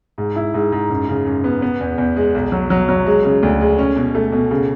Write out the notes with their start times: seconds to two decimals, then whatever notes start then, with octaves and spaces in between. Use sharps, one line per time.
0.18 G#2
0.36 E4
0.54 G#2
0.72 G#2
0.90 F#2
1.09 C#3
1.26 F#2
1.44 B3
1.62 B3
1.81 E2
1.98 E2
2.16 G#3
2.34 B1
2.52 F#3
2.70 F#3
2.89 F#3
3.07 G#3
3.25 C#3
3.43 D2
3.61 G#3
3.79 C#4
3.96 B2
4.15 A3
4.32 B2
4.51 C#3